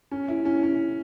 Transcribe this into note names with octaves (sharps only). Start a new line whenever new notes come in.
C#4
E4
C#4
C#4